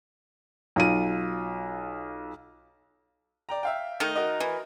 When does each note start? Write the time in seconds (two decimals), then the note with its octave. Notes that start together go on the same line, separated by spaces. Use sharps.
0.76 B1 F4 D#7
3.49 D5 G5 A#5
3.63 E5 F5 G5
4.00 D#3 A3 D#4
4.15 F#4 A#4 D#5
4.40 E3